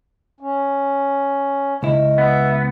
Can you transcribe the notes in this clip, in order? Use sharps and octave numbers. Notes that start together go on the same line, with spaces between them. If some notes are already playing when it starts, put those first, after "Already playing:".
C#4
C#2 E4 D#5
B3 E5